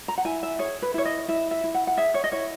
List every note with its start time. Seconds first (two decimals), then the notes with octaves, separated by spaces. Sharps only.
0.08 A#5
0.18 F#5
0.25 E4 G#5
0.43 E5
0.59 G#4 C#5
0.82 B4
0.94 E4 C#5
1.05 D#5
1.28 E4 E5
1.51 E5
1.64 E4
1.74 F#5
1.87 F#5
1.98 G#4 E5
2.14 C#5
2.24 D#5
2.32 E4 C#5